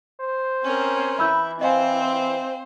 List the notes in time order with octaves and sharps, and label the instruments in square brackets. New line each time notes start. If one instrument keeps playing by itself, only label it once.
[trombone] C5
[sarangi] C4 [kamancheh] C#4 A#4
[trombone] E3 [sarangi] E4 [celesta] B5 E6 G6
[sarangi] C4 [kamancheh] C5 [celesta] D#5 F5 G#5